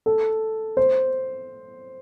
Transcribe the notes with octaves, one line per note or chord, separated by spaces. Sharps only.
A4
C5